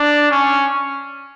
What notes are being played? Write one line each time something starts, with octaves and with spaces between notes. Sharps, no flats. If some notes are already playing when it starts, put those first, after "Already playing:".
Already playing: D4
C#4